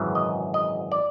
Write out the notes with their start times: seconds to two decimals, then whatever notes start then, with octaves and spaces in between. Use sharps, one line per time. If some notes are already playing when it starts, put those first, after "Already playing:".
Already playing: G#1 F#2 C#3 E3
0.15 D#5
0.54 D#5
0.92 D5